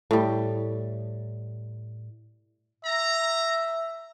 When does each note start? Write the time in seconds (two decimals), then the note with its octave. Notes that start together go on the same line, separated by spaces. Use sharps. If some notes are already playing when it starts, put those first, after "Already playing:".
0.11 A2 G3
2.85 E5 A#5